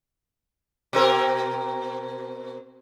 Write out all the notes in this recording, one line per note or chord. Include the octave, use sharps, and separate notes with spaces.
B2 C4 A#4